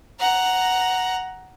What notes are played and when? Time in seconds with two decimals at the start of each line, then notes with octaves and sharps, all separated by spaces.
0.20 F#5 A#5